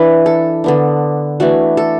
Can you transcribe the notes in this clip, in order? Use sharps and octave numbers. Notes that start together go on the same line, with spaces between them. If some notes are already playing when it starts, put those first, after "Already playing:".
Already playing: E3 D4 B4
A4
D3 B3 D4
E3 A3 D4 F#4
A4